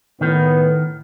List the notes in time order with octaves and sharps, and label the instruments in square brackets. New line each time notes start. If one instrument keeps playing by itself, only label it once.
[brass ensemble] A2 B3 [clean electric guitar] D#3